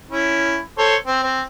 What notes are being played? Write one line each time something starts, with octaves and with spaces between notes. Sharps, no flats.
C#4 E4
A4 C5 C#5
C4
C4